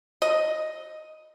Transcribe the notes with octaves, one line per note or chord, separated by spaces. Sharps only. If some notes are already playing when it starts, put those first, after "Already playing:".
D#5